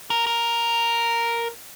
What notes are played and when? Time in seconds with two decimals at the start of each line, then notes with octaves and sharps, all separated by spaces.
0.10 A#4
0.27 A#4